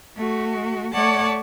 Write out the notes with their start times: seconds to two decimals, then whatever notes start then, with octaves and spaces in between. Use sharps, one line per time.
0.16 A3 F#4
0.93 A3 C#5 D5 F#5 A5